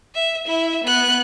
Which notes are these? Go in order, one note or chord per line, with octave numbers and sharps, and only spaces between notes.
E5
E4 E5
B3 F#6